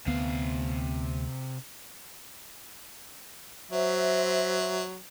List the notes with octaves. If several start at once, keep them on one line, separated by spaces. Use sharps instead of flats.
D2 C3 B3 F5
F#3 C5 E5